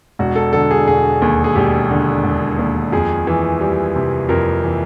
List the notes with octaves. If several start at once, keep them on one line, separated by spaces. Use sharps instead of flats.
E1 F#4
A4
D3 A4
G#4
E1 G#4
D#2
G#4
E1 G4
D3
E1
D#2
F2 G#4
E3
G3
C3
F2 A#4
E3